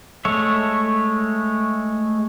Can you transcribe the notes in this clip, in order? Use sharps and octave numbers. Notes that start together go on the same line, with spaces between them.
G#3 A3 C#5 E5